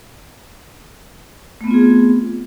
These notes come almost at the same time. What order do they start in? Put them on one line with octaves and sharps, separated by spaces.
A3 B3 C4 F4 G#4